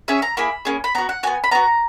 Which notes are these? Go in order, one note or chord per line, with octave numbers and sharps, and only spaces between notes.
C#4 G#4 E5
A#5
A#3 E4 G#4 B5
A#3 C#4 G#4
B5
B3 F#4 A#5
F#5
B3 F#4 G#5
B5
B3 F#4 A#5